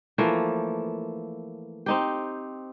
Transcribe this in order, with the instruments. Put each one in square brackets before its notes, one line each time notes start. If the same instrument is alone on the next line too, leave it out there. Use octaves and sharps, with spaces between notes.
[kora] E3 F3 A3 A#3
C4 D#4 G4